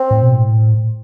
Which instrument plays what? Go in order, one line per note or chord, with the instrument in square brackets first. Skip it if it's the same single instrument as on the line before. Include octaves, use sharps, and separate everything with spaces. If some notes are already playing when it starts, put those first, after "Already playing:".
Already playing: [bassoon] C4
[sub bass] A2
B2
A2